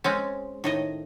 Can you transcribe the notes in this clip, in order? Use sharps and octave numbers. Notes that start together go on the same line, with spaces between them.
G#3 C4 C#4
A2 D#3 D#5